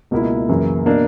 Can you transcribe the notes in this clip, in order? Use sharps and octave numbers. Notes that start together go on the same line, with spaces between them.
C#2 B2 A#3 E4
F#2 C#3 E3 A#3
B2 A#3 D4